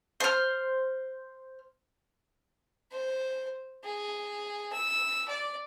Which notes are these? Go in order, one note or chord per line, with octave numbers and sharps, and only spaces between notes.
C5 F6
C5
G#4
E6
D5